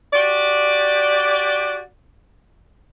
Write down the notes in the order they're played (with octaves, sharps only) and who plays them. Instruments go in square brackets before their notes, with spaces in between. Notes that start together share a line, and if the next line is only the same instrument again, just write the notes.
[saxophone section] F#4 G4 D5